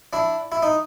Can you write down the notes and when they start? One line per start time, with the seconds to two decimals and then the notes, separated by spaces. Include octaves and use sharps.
0.13 D4 E4
0.52 E4
0.63 D#4